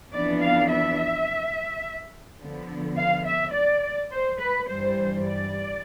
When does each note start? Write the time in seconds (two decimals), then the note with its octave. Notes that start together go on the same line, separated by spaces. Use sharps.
0.12 F2 E3 B3 D4 D5
0.41 F5
0.70 E5
2.40 D3 F3 B3
2.98 F5
3.26 E5
3.53 D5
4.12 C5
4.40 B4
4.68 G2 E3 G3 C5
5.25 D5